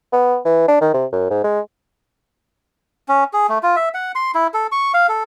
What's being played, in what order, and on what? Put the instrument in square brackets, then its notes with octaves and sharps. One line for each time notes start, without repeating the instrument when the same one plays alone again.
[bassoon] B3
E3
D4
D#3
C3
F#2
G#2
G#3
[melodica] C#4
G#4
A3
F4
E5
F#5
C6
E4
A4
C#6
F5
A4